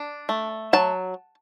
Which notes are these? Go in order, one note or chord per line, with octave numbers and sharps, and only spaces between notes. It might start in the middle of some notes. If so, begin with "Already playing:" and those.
Already playing: D4
A3
F#3 A5